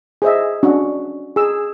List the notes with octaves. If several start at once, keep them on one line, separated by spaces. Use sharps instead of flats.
G#4 C5 D#5 E5
C#4 D4 F#4
G#4 E6